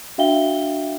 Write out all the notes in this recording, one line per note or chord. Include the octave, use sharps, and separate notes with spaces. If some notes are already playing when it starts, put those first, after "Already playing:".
D4 F#4 E5 F5 G5 G7